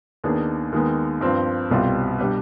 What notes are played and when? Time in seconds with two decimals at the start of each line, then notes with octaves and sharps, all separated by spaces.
0.24 D#2 D#3 B3 D4 G#4
0.72 D#2 D#3 G#3 B3
1.21 G2 F3 C4
1.70 C2 B2 G3 C4 F4
2.18 B2 G3 D4 G4 B4